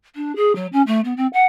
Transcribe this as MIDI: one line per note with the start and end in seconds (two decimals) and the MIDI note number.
0.15 0.35 62
0.36 0.54 68
0.55 0.67 54
0.72 0.82 61
0.86 1.00 57
1.04 1.13 59
1.17 1.27 60
1.33 1.45 78